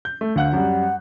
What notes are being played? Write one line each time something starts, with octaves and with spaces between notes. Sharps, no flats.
G6
A3
D2 F5 F#5 F#6
F#2 G3 F#5